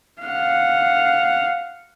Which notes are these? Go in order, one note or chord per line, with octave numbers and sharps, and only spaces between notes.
F5 F#5